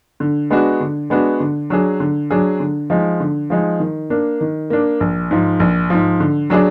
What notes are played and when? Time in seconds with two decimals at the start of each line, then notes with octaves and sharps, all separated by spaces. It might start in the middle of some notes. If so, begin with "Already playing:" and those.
0.20 D3
0.50 G#3 B3 D4 F#4
0.80 D3
1.10 G#3 B3 D4 F#4
1.40 D3
1.70 F#3 D4 G#4
2.00 D3
2.30 F#3 D4 G#4
2.60 D3
2.90 F3 G#3 D#4
3.20 D3
3.50 F3 G#3 D#4
3.80 D#3
4.10 A#3 D4
4.41 D#3
4.70 A#3 D4
5.00 A#1
5.31 G#2 F3
5.60 A#1
5.90 G#2 F3
6.20 D3
6.50 F#3 D4 G#4 D5